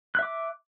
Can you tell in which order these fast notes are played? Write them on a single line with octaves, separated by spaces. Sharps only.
F#6 E5 D6